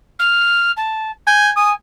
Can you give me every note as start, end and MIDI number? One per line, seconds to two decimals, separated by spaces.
0.19 0.72 89
0.77 1.11 81
1.27 1.51 80
1.27 1.51 91
1.56 1.74 80
1.56 1.71 87